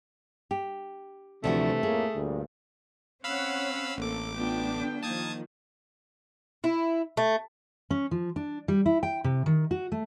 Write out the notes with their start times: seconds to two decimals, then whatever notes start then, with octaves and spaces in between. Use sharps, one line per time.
0.51 G4
1.44 D2 C3 E3 F3 A3 F#4
1.83 F2 A2 A#3 G#4
2.14 D2 G2 A#2
3.24 C4 C#4 C#5 F5 F#5 B5 E6
3.98 A1 A#3 A4 D6
4.35 A3 B3 D4 F4 G5
4.73 D3 G5
5.03 D#3 F3 A#3 A5 D#6 G#6
6.64 E4
7.17 A3
7.90 C#4
8.11 F3
8.36 D4
8.68 G3
8.86 E4
9.03 G5
9.24 C3
9.46 D#3
9.71 F#4
9.92 A3